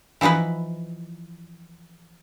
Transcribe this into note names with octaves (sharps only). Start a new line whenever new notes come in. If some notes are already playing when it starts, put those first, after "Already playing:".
E3 F3 D#4 E4 B4